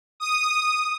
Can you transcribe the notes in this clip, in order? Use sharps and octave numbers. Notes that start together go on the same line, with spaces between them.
D#6